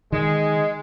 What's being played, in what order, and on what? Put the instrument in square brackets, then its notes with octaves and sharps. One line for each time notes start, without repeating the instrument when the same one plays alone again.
[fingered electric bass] D#3 [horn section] G#3